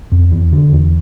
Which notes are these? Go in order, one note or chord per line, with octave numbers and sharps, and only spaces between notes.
F2
E2
D3
E2